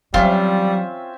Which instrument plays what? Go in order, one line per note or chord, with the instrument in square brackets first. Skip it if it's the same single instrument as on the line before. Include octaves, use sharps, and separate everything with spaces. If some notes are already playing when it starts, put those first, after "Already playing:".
[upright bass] E3 F#3 [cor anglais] G3 [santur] C4 C#4 E5 [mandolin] F4